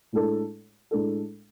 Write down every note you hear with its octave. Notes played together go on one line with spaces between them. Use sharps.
A2 G#3 D4 A4
A2 G#3 D4 A4